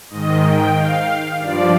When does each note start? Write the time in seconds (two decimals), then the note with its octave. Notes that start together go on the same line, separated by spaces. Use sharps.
0.10 G#2 D#3 D#5
0.43 G5
0.75 F5
1.39 G2 F3 D5